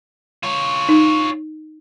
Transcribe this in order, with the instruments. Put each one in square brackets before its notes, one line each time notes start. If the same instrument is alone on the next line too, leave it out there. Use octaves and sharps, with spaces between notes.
[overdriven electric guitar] F4 C#5
[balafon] D#4